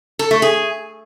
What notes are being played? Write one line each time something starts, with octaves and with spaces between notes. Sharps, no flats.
A4
A3
G#4